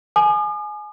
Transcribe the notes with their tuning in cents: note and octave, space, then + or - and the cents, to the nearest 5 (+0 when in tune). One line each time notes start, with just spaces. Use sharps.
G#5 +20 D#6 -45